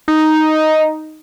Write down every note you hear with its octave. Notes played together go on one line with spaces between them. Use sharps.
D#4